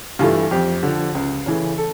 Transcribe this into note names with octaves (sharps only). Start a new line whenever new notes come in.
G2 E3 A3 F4
F2 G4
D3 F3
C#2
C#3 E3 A3
A4